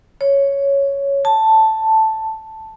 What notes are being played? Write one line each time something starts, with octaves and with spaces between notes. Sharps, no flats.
C#5
A5